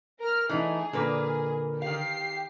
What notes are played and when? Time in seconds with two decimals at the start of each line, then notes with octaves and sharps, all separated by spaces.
0.19 A#4 F6
0.49 E3 A3 D#4 G#4
0.93 A#2 D3 A#3 A#4 B4
1.82 D#3 G4 F5 C7